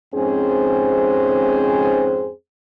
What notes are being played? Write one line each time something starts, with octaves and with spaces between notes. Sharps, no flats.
F2 G#2 C4 C#4 G#4 C5